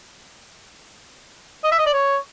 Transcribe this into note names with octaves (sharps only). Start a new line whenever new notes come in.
D#5
E5
D#5
D5
C#5